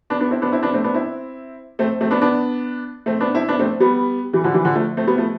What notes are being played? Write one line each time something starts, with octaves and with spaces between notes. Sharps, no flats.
B3 D4
B3 D4
C4 E4
B3 D4
C4 E4
B3 D4
A3 C4
B3 D4
C4 E4
A3 C4
A3 C4
B3 D4
B3 D4
A3 C4
B3 D4
C4 E4
B3 D4
A3 C4
G3 B3
E3 G3
D3 F3
E3 G3
D3 F3
F3 A3
A3 C4
G3 B3
F3 A3